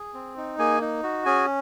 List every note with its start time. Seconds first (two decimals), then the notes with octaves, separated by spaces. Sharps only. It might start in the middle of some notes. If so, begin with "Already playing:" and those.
Already playing: G#4
0.14 C4
0.37 D#4
0.58 A#3 G#4 G#5
0.81 D#4
1.03 F#4
1.26 C#4 G#4 G#5